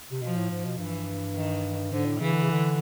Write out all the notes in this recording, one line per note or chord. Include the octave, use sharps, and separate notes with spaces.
C3
B2 F3
A2
G#2
B2
G2 E3
D#3
G#2 D3
A2
C#3 E3
D3
C#3
D3